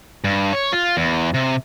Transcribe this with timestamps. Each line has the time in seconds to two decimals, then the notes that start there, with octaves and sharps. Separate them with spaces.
0.24 G2
0.53 C#5
0.72 F4
0.97 E2
1.34 C3